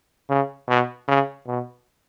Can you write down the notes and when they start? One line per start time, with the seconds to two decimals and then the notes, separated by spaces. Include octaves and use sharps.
0.29 C#3
0.68 B2
1.08 C#3
1.47 B2